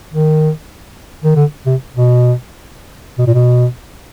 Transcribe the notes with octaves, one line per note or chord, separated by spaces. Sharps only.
D#3
D#3
D3
C3
B2
B2
A#2
B2